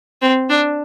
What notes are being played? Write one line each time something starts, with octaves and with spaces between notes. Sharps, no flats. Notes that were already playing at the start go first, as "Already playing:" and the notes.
C4
D4